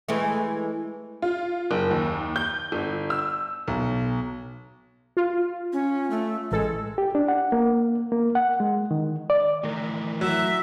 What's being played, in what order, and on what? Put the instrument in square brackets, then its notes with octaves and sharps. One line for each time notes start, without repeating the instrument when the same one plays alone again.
[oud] E3 G#3 A3
[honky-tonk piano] F4
F#1
D#2
G6
G1
E6
[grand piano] B1
[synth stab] F4
[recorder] C#4
A3
[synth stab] A1 A4 [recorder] G#3
[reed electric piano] G4
D4
F#5
A#3
A#3
F#5
G#3
D#3
D5
[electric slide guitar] A2 A#4 [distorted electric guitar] D#3 E3
[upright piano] F#3 [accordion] E5